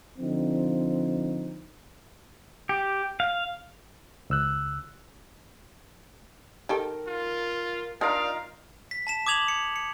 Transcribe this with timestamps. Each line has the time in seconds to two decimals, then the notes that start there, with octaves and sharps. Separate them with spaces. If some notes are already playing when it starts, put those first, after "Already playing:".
0.19 D3 F3 C4 D#4
2.69 G4
3.20 F5
4.30 C#2 E6 F#6
6.69 D#3 G4 A4 A#4
7.07 F4
8.01 D4 D#4 F4 A#4 D5 F5
8.91 B6
9.07 A5 B6 E7
9.27 D6 D#6 G#6 F7 F#7
9.48 C#7
9.76 C#7